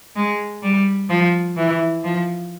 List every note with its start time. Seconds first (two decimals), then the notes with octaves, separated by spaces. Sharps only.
0.16 G#3
0.63 G3
1.09 F3
1.57 E3
2.04 F3